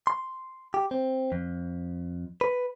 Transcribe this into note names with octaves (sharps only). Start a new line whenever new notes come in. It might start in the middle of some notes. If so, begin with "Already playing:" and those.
C6
G4
C4
F2
B4